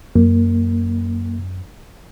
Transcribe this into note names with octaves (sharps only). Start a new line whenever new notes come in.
F#2 A#3